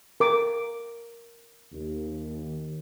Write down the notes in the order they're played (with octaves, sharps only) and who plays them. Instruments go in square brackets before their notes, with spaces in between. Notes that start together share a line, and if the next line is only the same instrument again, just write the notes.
[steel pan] A#4 D6
[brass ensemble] D#2